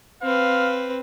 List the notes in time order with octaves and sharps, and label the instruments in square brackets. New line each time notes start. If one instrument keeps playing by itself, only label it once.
[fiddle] C4 B4 [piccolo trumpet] F5